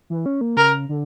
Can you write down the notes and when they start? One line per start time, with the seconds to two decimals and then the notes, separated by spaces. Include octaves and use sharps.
0.10 E3
0.26 C#4
0.41 A#3
0.57 C#3 A#4
0.89 D3